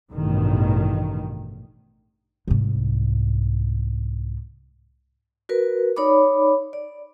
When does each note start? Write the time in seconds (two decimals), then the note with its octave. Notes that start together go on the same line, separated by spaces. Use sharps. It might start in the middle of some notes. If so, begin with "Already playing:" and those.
0.11 A1 G2 B2 D#3
2.48 C2 G#2
5.49 F#4 A#4 B4
5.96 D#4 C#5 D5 B5 D6
6.73 D5